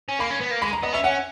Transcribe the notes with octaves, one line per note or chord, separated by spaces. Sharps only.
C#4
A#3 B5
C#4
B3
A#3
G#3 B5
A#5
B3 D#5
C#4 E5
C#4 F#5